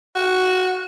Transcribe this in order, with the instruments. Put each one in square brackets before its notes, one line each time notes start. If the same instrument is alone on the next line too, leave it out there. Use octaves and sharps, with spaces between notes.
[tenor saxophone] F#4